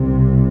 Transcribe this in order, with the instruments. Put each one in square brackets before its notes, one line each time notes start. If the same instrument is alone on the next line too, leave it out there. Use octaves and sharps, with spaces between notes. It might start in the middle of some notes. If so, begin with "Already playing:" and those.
Already playing: [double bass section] C2 C3